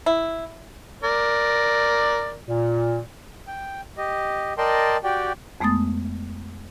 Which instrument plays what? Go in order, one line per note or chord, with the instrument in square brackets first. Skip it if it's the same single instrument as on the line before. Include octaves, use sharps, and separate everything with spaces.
[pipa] E4
[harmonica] A#4 D5
[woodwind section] A#2
[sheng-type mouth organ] G5
G4 D#5
A#4 D5 D#5 G5 A5 C6
F#4 G4 D5 G5
[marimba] F2 G#3 A3 B3 D#6 A6